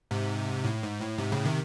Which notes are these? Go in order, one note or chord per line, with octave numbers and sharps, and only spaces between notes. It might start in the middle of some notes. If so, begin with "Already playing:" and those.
G#2 C3
A2
G#2
A2
G#2 C3
A2 C#3
C3 D#3